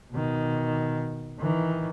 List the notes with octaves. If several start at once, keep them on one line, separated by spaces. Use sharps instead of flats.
B2 D#3
D#3 E3